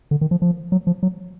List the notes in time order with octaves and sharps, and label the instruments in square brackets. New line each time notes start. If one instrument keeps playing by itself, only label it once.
[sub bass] D3
D#3
F3
F3
F#3
F3
F#3